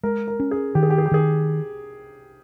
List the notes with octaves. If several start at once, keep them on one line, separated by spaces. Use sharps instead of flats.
G#3 A#4
A#4
C#4
G#4
D#3 G4
G#4
G4
G#4
G4
D#3 G#4